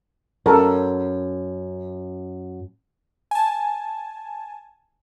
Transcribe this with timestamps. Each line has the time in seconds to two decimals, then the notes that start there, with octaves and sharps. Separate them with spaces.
0.46 F#2 A4 A#4 A5
3.31 G#5 A5